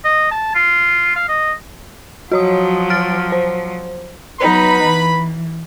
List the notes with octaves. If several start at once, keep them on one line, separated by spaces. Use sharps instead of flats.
D#5
A5
F4
F5
D#5
F3 F#3 F#4 C#5 D#6
F6 A6 D7
C5
F#3 B3 D#4 B4 B5
E3